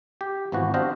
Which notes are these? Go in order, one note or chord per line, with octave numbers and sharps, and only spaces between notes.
G4
G#1 E3 F3 B3 F#4
D4 F#4 G4 C5 D#5 F5